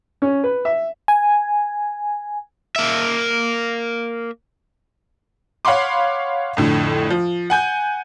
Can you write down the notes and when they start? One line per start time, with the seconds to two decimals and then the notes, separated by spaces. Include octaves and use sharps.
0.22 C#4
0.44 B4
0.65 E5
1.08 G#5
2.76 A#3 E5
5.65 C#5 F5 F#5 B5 C6 D6
6.57 F2 A2 D3
7.10 F3
7.50 F#5 G#5 G6